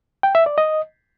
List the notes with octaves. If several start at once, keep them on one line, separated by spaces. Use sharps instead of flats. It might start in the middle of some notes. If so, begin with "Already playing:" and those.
G5
E5
D5
D#5